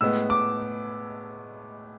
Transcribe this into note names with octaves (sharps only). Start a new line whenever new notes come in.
A2 G#3 B3 E6
D6